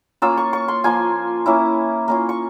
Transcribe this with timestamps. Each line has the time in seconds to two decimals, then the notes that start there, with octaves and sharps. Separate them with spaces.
0.22 A#3 C#4 F4 E6
0.37 C#6
0.53 C#6
0.68 C6
0.84 F3 A#3 F4 G#5
1.46 A#3 C#4 E4
2.08 A#3 C#4 F4
2.29 C#6